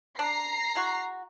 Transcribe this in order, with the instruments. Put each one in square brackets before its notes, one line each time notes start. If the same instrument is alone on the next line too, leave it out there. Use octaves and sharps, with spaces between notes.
[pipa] D4 [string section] A#5 C7
[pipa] G#3 E4 F#4